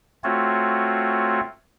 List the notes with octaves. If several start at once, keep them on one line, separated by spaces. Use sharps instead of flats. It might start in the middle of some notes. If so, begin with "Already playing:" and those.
A3 C4 F4 F#4 C#5